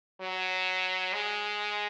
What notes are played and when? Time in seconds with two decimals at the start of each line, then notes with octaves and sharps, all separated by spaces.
0.21 F#3
1.13 G#3